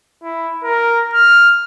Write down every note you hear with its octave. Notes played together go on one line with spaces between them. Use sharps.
E4
A#4
F6